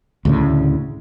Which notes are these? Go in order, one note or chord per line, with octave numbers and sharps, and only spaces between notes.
D2 A2 C#3